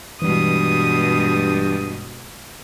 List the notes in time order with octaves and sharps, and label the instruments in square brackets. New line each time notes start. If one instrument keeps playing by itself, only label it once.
[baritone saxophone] G2 [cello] B2 G#3 [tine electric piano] E3 G3 [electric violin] D#6